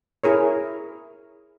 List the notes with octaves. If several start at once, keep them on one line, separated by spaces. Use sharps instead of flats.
E4 G#4 A#4 C#5